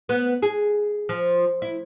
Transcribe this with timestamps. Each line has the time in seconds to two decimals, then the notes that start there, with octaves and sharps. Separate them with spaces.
0.09 B3
0.42 G#4
1.09 F3
1.62 E4